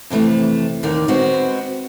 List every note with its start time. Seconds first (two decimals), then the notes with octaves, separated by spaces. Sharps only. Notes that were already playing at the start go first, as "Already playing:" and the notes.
0.10 F2 C3 E3 A3
0.83 D#2 D3 D#3
1.08 G#3 B3 C4 F#4